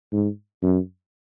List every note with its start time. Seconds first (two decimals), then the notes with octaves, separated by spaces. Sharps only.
0.13 G#2
0.63 F#2